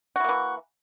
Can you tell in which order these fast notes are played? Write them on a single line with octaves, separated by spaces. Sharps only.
F#4 E4 A#3 E3